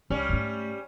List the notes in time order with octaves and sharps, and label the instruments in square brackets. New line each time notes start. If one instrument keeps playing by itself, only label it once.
[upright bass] C#2 [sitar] G3 C#4
[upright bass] G#2 A3